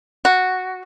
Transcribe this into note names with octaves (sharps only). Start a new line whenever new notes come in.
F#4